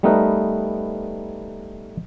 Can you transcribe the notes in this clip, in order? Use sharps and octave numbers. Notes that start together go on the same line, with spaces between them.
G3 A3 B3 D#4 A#4 B4